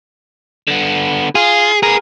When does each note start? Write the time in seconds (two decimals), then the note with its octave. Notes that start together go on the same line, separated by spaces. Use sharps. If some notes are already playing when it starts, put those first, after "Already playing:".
0.68 D3 B3
1.35 F4 G#4
1.83 B3 G#4 A#4